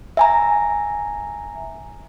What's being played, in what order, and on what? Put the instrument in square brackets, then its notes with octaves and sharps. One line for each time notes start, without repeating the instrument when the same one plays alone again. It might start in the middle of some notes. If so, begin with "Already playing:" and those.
[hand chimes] E5 G#5 A#5